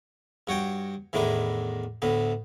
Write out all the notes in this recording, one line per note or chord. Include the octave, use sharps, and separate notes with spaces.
G2 F#4 C#5 G5
E2 A2 D#3 B3 D4 E4
D2 A2 B3